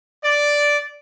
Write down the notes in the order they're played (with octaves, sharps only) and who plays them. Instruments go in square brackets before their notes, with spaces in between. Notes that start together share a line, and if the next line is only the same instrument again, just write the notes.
[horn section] D5